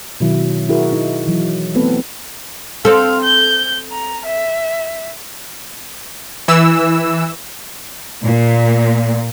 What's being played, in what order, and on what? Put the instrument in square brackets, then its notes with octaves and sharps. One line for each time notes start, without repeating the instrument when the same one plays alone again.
[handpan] B2 D#3 F#3 E4
E4 F#4 G#4 A#4
D#4
E3 F#3
A3 B3 C4 A4 B4
[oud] C4 A4 [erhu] F5
[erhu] G6
A#5
E5
[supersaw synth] E3 E6
[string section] A#2